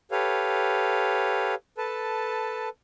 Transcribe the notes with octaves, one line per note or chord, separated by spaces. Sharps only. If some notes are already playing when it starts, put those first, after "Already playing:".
G4 A4 B4 C#5 F5
A4 B4 A5